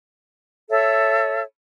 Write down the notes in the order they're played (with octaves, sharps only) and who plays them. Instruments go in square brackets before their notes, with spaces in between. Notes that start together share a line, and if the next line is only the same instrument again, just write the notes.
[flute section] A4 C#5 E5